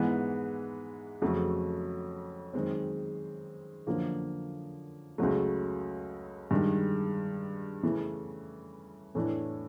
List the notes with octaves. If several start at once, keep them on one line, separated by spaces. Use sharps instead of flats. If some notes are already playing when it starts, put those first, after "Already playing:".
Already playing: G#2 E3 G#3 B3
F2 C#3 F#3 A3
F#2 D#3 G#3 C4
F#2 D3 F3 A#3
C#2 C#3 F#3 A3
G2 D#3 G#3
C#3 E3 A3
A2 E3 A3 D4